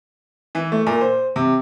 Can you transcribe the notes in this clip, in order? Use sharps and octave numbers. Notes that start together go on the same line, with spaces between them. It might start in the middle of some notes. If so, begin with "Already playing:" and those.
E3
A3
A#2
C5
C3